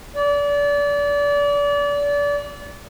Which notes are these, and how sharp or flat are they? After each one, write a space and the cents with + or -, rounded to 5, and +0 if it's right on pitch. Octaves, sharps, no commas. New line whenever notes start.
D5 -30